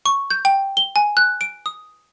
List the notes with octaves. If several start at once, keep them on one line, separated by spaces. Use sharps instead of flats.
C#6
G6
G5
G7
G#5
F#6
D7
D#6